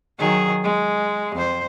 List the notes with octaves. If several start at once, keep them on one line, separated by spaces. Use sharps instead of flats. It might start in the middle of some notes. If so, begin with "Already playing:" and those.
D#3 F#3 G#4
G#3
F2 C5